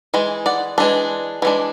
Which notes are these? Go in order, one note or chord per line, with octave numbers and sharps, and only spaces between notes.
E3 G#3
D5 F#5
E3 G#3 D4
E3 G#3 D4